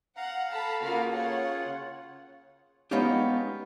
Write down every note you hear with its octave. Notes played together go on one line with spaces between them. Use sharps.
F5 F#5 A#5
A4 A5 B5
C#3 A#3 F4 F#4 F5
C#5 F#5
G#3 B3 C#4 D#4 F4 G4